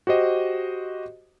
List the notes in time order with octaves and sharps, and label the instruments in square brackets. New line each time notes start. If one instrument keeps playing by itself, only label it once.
[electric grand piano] F#4 G4 C5 D#5